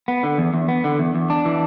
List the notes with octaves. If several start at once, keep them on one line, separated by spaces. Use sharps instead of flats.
B3
D3
E2
E2
B3
D3
E2
E2
D4
E3